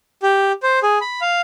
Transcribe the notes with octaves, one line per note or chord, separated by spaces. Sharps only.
G4
C5
G#4
B5
F5